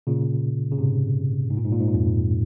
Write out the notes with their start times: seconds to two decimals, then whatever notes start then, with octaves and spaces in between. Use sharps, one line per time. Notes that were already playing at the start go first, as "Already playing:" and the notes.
0.07 A#2 C#3
0.72 C#3
0.78 G#2 C3
1.50 G#2
1.57 A#2
1.65 G#2
1.72 A#2
1.80 G#2
1.87 A#2
1.95 F2 G#2